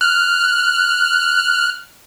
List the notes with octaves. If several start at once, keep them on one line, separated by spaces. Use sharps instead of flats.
F6 F#6